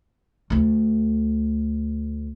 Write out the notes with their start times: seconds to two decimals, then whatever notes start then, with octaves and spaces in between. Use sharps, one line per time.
0.50 D2 A3